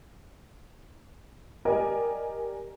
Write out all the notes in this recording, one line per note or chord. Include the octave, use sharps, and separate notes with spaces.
G4 A#4 D5 D#5 G#5